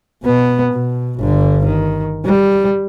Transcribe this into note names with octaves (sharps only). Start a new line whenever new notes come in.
B2 B3
B2
G1 D3
D#3
G3